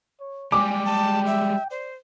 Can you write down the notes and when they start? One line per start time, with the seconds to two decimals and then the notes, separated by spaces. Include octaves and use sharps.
0.20 C#5
0.52 G3 G#3 G5 G#5 D6
0.85 G5 A5
1.26 E5
1.70 C5 D5